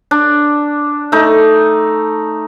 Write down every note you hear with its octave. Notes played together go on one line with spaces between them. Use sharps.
D4
A3 D#4